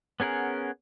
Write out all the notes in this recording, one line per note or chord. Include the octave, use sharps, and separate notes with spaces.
B3 C#4 G#4 A#4 F#5